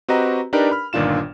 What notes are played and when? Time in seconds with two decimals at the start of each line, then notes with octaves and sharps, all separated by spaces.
0.09 C4 F#4 G4 B4 D#5 A#5
0.53 D4 D#4 G4 A#4 B4 D5
0.71 B5 F6
0.93 G1 A#2 D#3 D4 F4 E7